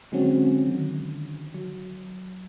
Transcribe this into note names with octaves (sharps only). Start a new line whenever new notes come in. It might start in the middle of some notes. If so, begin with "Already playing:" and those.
D3 F#3 G#3 C4 C#4 F#4
D3 D#3
F#3